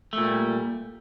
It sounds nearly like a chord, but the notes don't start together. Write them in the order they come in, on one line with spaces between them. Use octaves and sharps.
A3 A#2 G3